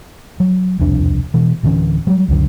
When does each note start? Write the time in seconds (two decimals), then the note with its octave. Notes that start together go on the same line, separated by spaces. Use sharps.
0.40 F#3
0.79 E1 C2 F2 D4
1.34 B2 E3
1.63 D1 D3 E3 C#4
2.07 F#3 G3
2.28 C#2 F#2 D3